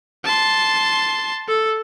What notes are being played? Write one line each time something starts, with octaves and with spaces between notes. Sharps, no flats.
A5 C6
A4